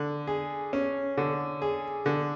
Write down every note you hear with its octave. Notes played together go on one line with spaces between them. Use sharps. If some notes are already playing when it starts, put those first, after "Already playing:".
Already playing: D3
G#4
C#4
D3
G#4
D3